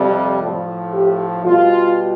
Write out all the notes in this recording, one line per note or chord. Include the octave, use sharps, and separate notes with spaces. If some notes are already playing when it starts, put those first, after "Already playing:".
Already playing: F2 C3 G3
A2 F3
G4
B2 G3 F4